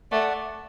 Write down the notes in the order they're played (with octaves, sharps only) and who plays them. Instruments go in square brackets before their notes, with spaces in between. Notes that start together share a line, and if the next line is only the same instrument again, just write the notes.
[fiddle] A3 [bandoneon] D5 F#5